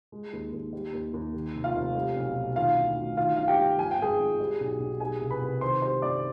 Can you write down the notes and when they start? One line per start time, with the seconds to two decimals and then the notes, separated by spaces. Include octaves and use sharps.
0.12 G#3
0.33 D#2
0.53 D#2
0.73 G3
0.93 D#2
1.14 D#2
1.34 D#3
1.55 F1
1.64 F4 F5
1.75 F1
1.95 G3
2.16 B1
2.36 B1
2.56 D#3 F4 F5
2.77 D2
2.98 D2
3.17 D#3 F4 F5
3.37 G1 F5
3.48 G4 G5
3.58 G1
3.78 F3 G#5
3.91 G5
3.99 G#1 G#4 G#5
4.19 G#1
4.40 G3
4.60 B1
4.80 B1
5.00 G3 G#4 G#5
5.21 C2
5.31 B4 B5
5.42 C2
5.61 D#3 C5 C6
5.82 G3 C5 C6
6.02 G1 D5 D6